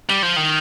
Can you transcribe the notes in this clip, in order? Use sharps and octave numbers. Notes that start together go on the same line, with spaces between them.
G3
F3
D#3